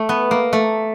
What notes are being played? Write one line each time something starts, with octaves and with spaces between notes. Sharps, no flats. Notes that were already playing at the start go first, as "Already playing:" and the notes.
Already playing: A3
B3
A#3
A3